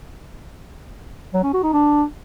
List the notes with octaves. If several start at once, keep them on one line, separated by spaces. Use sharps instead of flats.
F#3
C#4
F#4
D#4
D4